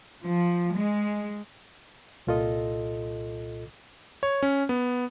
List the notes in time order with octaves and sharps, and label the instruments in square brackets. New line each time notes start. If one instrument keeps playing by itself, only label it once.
[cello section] F3
G#3
[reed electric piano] C2 A#2 F4 A4 D#5
[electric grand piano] C#5
C#4
B3